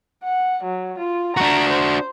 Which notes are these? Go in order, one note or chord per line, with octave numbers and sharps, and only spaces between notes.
F#5
F#3
F4
D4 F#4 A#5
C5